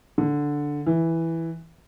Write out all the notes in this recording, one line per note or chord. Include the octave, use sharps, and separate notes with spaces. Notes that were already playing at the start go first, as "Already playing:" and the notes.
D3
E3